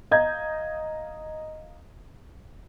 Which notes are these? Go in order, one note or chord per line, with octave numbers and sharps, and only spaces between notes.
D#5 F5 A#5 G6 G#6